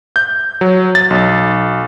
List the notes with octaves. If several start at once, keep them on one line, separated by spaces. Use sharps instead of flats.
G6
F#3
A6
B1